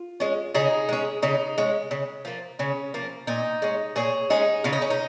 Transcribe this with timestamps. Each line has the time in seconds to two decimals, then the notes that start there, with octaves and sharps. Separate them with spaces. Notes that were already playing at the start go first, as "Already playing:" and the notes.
Already playing: F4
0.20 G#3 C#4
0.54 C#3 D#4 G#4
0.89 G#3 C#4
1.22 C#3 D#4
1.58 G#3 C#4
1.91 C#3
2.25 F3 A#3
2.59 C#3 C#4
2.94 F3 A#3
3.27 A#2 D#4
3.62 G#3 C#4
3.96 A#2 G#4 C#5
4.30 G#3 C#4 D#4 G#4
4.64 C#3 F4
4.73 D#4
4.82 C#4
4.90 D#4